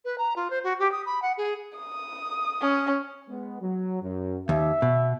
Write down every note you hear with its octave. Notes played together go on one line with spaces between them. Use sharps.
B4
A#5
F4
C5
F#4
G4
D#6
B5
F#5
G#4
D#6
C#4
G#3 B3
F#3
F#2
D#2 E5
B2